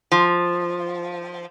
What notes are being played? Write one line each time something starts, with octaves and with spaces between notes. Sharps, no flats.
F3